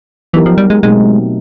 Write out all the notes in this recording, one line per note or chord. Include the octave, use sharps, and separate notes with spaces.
E3 F#3 B3 D#4 G4 A#4
F3
G3
G#3
B2 F#3 G#3 A3 C4 D#4